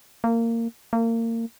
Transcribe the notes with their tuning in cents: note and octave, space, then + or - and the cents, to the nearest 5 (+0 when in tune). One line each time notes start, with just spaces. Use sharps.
A#3 -20
A#3 -30